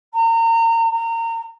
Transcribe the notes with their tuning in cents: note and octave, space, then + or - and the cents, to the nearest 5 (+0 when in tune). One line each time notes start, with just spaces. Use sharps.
A#5 -30
A#5 -30